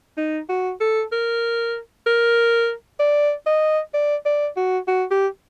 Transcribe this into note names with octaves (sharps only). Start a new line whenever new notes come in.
D#4
F#4
A4
A#4
A#4
D5
D#5
D5
D5
F#4
F#4
G4